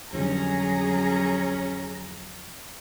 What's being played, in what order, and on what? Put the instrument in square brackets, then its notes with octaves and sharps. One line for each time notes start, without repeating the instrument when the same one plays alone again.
[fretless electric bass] F2 D3 G3 [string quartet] F#3 A#5 [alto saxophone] C#4 [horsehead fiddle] G#4